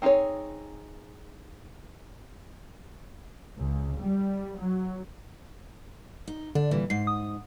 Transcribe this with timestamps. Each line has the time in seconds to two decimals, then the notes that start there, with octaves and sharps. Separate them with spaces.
0.02 C4 D#4 F4 G#4 C#5
3.57 C#2
4.00 G3
4.58 F#3
6.27 D#4
6.55 D3 D4
6.71 A#2 E3 G3
6.90 G#2 C7
7.07 D#6